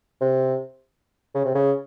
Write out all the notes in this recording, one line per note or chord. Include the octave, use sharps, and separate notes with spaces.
C3
C#3
C3
C#3